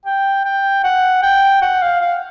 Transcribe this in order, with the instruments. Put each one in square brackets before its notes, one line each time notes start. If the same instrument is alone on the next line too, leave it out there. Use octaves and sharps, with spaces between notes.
[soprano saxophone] G5
G5
F#5
G5
F#5
F5
F5